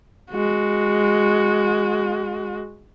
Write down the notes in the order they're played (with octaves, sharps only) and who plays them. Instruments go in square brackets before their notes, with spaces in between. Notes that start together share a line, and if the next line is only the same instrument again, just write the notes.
[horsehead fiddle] G#3 F#4